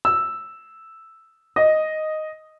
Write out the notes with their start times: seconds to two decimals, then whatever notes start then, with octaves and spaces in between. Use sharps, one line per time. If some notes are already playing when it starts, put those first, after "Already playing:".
0.05 E6
1.56 D#5